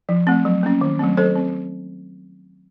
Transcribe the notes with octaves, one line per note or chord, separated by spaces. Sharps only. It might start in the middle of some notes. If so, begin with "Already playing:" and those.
F3
A3 C4
F#3
A#3 C#4
D#3
F#3 A3 C4
F#3 A4 C5
C4